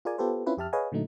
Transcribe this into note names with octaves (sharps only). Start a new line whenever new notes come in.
F4 G#4 A#4 D5 G#5
B3 F4 G4 A4 B4 C5
C4 C#4 E4 F4 B4
F2 G4 E5 A5 F6
G#4 B4 C#5 D#5 F5 G#5
A#2 D3 F#3 A3 D#4